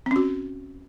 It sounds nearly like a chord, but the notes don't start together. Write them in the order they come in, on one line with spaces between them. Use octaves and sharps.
C4 C#4 F#4